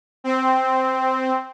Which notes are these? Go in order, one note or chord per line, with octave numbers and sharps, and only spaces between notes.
C4